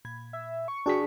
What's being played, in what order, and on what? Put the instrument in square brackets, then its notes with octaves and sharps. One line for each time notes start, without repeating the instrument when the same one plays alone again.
[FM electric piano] A#2 B5 G#6
[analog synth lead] E5
C#6
[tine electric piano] D4 G#4 B6 [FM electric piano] F#4 G5 [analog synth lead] C#6